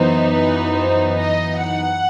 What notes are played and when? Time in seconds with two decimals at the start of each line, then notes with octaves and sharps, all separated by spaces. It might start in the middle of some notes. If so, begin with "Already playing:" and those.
Already playing: F#2 E3 B3 D#4 C5
0.34 B4
0.76 C5
1.19 D#5
1.61 F#5